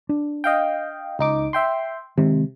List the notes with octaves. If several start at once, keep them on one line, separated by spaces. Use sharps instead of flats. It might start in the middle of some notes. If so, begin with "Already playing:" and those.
D4
D#5 F5 G5
C#2 D#4 D6
E5 G5 C6
C3 D#3 G#3 C4